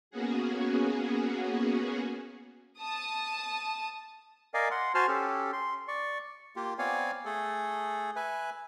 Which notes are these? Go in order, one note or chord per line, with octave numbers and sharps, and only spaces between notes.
A#3 B3 C#4 F#4 G#4
A5 D#6
A#4 D5 D#5 F5 G#5
F#5 C6
F#4 C5 G#5 A5 C6 F6
C#4 G4 A4
C6
D5 C#6
A#3 F4 G4
B3 C4 C#5 D5 F5 G#5
A3 G#4 A4
B4 E5 G#5